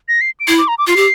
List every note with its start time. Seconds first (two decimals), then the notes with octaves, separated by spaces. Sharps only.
0.08 A#6
0.21 C7
0.40 D7
0.47 E4 C7
0.58 D6
0.68 A#5
0.78 D6
0.87 F4 C7
0.96 G4